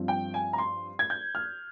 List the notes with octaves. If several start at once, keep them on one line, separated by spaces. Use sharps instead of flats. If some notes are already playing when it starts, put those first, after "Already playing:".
Already playing: G2 F3 C4
G5
G#5
A#5
C6
G#6
G6
F6